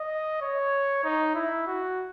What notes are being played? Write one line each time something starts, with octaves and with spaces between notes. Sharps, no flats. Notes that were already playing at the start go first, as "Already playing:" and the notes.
Already playing: D#5
C#5
D#4
E4
F#4